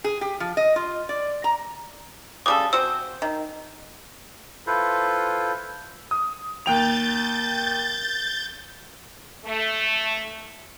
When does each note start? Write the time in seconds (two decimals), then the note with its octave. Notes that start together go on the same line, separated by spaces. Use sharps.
0.04 G#4
0.21 G4
0.40 F3
0.57 D#5
0.76 F4
1.09 D5
1.44 A#5
2.46 C#3 G3 A4 D6 D#6
2.73 C4 F#4 C5 E6
3.22 D#3
4.67 E4 F4 A4 B4 C5
6.11 D#6
6.66 D#2 G5 G6 A6 F7
9.46 A3